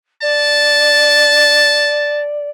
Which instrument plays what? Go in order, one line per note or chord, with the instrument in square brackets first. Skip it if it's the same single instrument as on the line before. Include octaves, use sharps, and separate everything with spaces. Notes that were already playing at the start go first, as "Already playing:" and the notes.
[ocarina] D5 [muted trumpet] A5